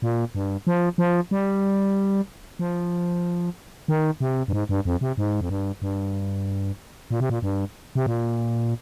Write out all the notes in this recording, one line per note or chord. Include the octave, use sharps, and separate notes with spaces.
A#2
G2
F3
F3
G3
F3
D#3
C3
G2
G#2
G2
F2
C3
G#2
F2
G2
G2
A#2
C3
A#2
G2
C3
A#2